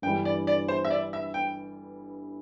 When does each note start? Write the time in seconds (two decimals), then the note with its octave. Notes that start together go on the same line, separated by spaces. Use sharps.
0.02 G1 G2 E3 G3 G5
0.25 D5
0.47 D5
0.68 C5
0.85 E5
0.91 D5
1.13 E5
1.34 G5